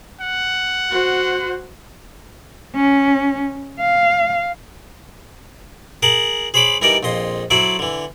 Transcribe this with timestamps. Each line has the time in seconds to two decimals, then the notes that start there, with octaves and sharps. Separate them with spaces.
0.21 F#5
0.90 F#4 C5
2.75 C#4
3.80 F5
6.03 G#4 A#4 F#5 A5
6.54 G#4 C5 C#5 B5 D6
6.82 E3 G3 D#4 A#4 D5
7.03 A#1 F2 D#5 C6
7.50 F#3 E4 A4 C5 D5
7.79 D3 E3